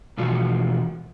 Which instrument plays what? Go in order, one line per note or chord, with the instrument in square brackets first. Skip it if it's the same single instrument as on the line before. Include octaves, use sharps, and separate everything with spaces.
[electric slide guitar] B2 E3 F3 F#4